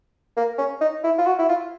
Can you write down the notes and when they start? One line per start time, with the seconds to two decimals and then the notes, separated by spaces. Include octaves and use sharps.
0.37 A#3
0.58 C#4
0.81 D#4
1.04 E4
1.19 F4
1.27 F#4
1.39 E4
1.49 F4